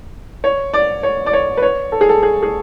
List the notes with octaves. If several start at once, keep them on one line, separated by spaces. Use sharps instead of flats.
C#5
D5
C#5
D5
C#5
B4
C#5
A4
G#4
A4
G#4
G#4